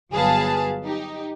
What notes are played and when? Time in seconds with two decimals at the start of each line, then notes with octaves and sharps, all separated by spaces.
0.12 G1 F#3 G#4 B4 F5 A5
0.84 D#4 G4